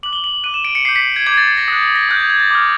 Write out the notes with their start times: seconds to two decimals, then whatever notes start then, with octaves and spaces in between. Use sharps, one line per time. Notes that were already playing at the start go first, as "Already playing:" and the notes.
0.03 D6 F#6 F#7
0.13 G7
0.24 F#7
0.44 D6 F#6 D#7
0.54 E7
0.65 D7
0.75 C#7
0.85 D6 G6 C7
0.96 B6
1.16 G#6
1.26 D6 G6 G#6
1.37 A6
1.48 A6
1.57 A#6
1.68 D#6 A#6
1.72 F#6
1.96 A#6
2.09 D#6 F#6 G6
2.20 G#6
2.30 G#6
2.40 A6
2.51 D6 F6